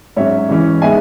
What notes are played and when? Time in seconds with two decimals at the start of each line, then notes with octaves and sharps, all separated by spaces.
0.16 G#2 F#3 C#4 C#5 E5
0.49 C#3 E3 G#3 C#4
0.82 G#3 B3 D#4 E5 G#5